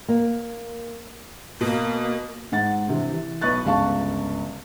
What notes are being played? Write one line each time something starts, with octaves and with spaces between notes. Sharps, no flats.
A#3
B2 A#3
G#2 F#5 A6
G2 C3 E3
E3
B1 B4 D#5 C#6 F#6 A6
G1 C#2 F5 A5 C#6